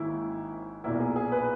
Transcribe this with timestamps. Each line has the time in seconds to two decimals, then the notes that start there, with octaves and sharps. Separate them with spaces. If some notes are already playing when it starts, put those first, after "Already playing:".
Already playing: G#1 G#2 D#3 A#3 C#4 E4
0.84 B1 A#2 A#3 E4
1.00 G#4
1.16 G#4
1.32 B4